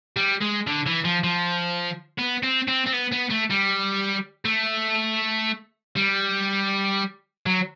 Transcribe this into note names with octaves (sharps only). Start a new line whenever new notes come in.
G3
G#3
D3
E3
F3
F3
B3
C4
C4
C4
B3
B3
A3
G3
A3
G3
F#3